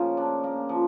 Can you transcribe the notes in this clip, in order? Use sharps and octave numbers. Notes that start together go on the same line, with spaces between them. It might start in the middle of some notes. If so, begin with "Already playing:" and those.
Already playing: C#3 F3 A#3
D4
A#3
F3